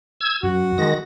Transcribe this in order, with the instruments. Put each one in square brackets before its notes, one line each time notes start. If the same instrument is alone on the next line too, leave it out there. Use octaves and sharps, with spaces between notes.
[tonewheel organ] E6 G#6
[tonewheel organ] F#2 [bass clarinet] F#4
[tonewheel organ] D#3 G#3 A#6